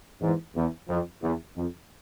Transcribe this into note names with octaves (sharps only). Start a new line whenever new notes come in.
E2 G#2
E2
F2
E2
F2